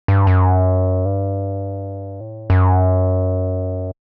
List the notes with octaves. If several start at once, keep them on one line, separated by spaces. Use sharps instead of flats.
G2
F#2
G2
A2
F#2